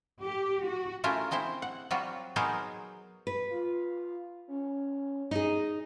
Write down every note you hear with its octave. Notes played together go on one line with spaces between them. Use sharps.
G4
F#4
A3 C#4 E4 F4 A#4 C5
G#3 C4 E4 C5
F#5
F#3 G3 C4 F4 F#4
F#3 B3 D#4 G#4 A#4 C5
B4
F4
C#4
D#4 G#4 D#5